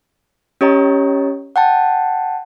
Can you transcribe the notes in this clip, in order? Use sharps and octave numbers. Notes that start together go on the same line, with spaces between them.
C#4 G4 C#5 D#5 A#5
F#5 G5 A5